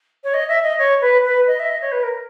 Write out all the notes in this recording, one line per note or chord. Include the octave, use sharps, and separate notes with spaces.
C#5
D#5
E5
D#5
C#5
B4
B4
D#5
E5
D#5
C#5
B4
A#4